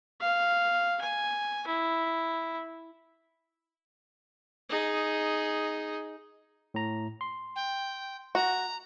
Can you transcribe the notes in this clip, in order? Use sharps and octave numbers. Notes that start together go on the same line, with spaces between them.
F5
G#5
E4
D#4 G#4
A2 A#5
C6
G5
F#4 A#5